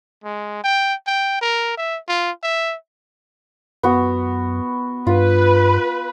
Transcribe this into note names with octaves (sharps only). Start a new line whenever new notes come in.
G#3
G5
G5
A#4
E5
F4
E5
F#2 B3 F#4
G2 F4 B4